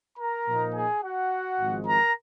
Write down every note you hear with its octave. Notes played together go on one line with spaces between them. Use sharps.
A#4 A#5
A#2 F3 A#3 D#4
G#4 G#5
F#4 F#5
G#1 G#2 F3 G#3
A#4 A#5